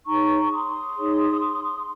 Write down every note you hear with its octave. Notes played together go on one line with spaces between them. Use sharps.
D#4 G#4 C#5 A#5 C#6
C6 D#6
D#4 G#4 C#5